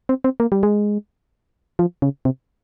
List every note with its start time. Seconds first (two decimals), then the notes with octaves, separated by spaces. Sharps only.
0.09 C4
0.24 C4
0.40 A#3
0.52 G3
0.63 G#3
1.79 F3
2.02 C#3
2.25 C3